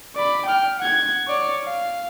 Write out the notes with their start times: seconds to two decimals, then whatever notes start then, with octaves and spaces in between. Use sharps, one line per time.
0.16 D5 B5
0.46 G5 F6
0.79 F#5 G#6
1.28 C#5 D5
1.64 F5